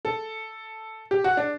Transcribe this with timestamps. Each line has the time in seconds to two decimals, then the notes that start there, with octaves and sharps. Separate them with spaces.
0.05 A4
1.11 G4
1.24 F#4
1.37 D4